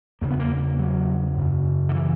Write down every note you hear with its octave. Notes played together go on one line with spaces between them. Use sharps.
E2 C#3 A#3
B3
A#3
F#3
F#2 C#3
D3
E3